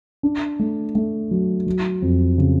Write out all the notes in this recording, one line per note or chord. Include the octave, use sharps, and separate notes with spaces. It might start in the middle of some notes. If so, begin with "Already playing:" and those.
D4
A3
A3
F#3
F#3
F2
C#3